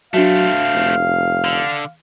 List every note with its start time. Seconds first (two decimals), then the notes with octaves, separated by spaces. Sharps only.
0.14 F#3 A3 C4 D4 F#4 E5 F5
0.73 F1
1.45 D3